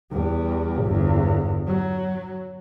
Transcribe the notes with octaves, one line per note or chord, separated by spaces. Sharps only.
E2 G3
G1 E2
F#3